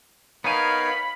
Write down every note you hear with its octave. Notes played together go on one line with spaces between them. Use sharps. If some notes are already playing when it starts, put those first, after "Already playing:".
B3 D#4 A#4 C#5 F5 G#5 B5